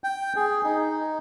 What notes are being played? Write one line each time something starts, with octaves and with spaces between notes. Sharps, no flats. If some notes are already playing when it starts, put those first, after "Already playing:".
G5
G#4
D#4